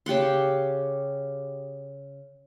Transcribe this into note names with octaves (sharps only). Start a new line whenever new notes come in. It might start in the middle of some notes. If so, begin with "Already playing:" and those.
C#3 G4 F#5 C6